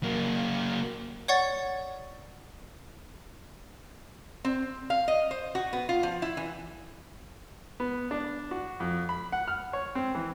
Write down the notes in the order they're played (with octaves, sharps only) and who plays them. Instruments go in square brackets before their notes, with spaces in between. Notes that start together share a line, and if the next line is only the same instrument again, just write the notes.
[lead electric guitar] F#3 A#3
[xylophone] C#5 D5 F#5 C#6 G#6 A6
[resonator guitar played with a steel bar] C4
F5
D#5
C5
F#4
B3
F4
F3
E4
E3
[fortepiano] B3
D4
F#4
F2
B5
F#5
F6
C#5
C4
E3